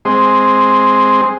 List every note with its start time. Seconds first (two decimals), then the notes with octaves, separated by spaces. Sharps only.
0.05 G#3 C4